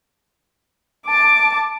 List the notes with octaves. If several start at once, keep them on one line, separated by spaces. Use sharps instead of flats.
A5 D6